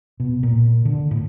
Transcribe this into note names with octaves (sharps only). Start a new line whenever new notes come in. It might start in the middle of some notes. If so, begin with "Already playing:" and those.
B2
A#2
D3
A2